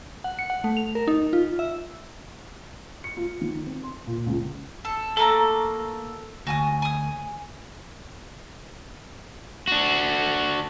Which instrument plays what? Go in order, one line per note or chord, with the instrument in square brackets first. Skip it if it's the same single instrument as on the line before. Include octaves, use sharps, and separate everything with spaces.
[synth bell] F#5
C#7
F#5
A3
F7
A#4
D#4
F4
E5
[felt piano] C#7
F4
D#3
C4
C6
A#2
C#2
[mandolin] A4
[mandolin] A3 A#3 A#5 [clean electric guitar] A4
[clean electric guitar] D2 [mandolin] F#4 G#5 D#6
[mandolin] G#5 D#6
[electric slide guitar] D4 F#4